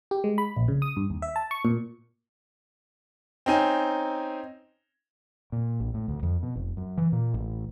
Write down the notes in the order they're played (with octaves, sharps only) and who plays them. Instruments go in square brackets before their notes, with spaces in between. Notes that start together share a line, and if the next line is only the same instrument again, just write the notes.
[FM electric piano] G4
G#3
B5
A#1
C#3
D#6
G2
D#2
E5
A5
C#6
A#2
[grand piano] C4 C#4 D#4 G#5
[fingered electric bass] A#2
A#1
A2
D2
F2
B2
F1
F#2
E3
A#2
A1